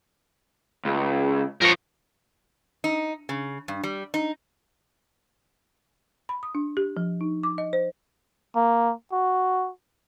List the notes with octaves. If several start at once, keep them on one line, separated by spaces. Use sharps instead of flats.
C#2
F3 A#4 C#5
D#4
C#3
G2
G3
D#4
B5
D#6
D4
G4
F3
D#4
D6
D#5
C5
A#3
F#4